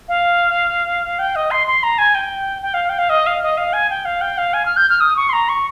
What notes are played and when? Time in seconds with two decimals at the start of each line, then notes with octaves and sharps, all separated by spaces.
0.09 F5
1.19 G5
1.36 D#5
1.51 C6
1.67 C6
1.83 A#5
1.98 G#5
2.15 G5
2.62 G5
2.74 F5
2.89 G5
2.99 F5
3.10 D#5
3.27 F5
3.42 D#5
3.58 F5
3.73 G#5
3.90 G5
4.05 F5
4.21 G5
4.38 F5
4.54 G#5
4.66 F6
4.77 G6
4.90 F6
5.01 D#6
5.17 C#6
5.29 C6
5.33 A#5
5.49 C#6